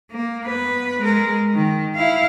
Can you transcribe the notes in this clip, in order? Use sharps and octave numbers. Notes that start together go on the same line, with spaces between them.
A#3
B3 B4
G#3 A#4
D#3
E4 F5